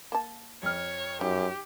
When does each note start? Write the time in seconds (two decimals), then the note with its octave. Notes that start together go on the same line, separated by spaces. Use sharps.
0.12 A#3 A5
0.63 F2 C#5 F6
1.21 F#2 D#4 G4